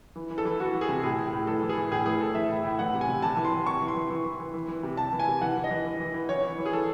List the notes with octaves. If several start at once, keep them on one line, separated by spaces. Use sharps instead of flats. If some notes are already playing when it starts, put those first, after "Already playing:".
E3
E3
A4
E3
E3 F#4
E3
G#4
C3
A2 G#4
A2
A2
E3 A4
E3
G#4
E3
A2 G#4
E3 G#4
A2 A4
E3 E5
A2
A2
E3 F#5
C3
G#5
C3
C3 A5
E3
C6
E3
C3 C#6
E3
C6
E3
E3
E3
E3
E3
E3
C3
C3 A5
E3
G#5
C3
E3 F#5
E3
D#5
E3
E3
E3
E3
E3 C#5
E3
E3
G#4
E3 A4